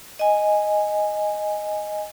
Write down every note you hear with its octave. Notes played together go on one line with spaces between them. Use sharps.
D#5 G#5